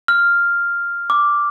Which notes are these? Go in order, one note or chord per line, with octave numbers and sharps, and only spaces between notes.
F6
D6